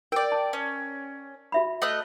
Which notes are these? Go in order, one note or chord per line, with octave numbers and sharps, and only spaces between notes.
A#4 D5 G5
A5
C#4
F#4 E5 B5
A3 D#5 F#6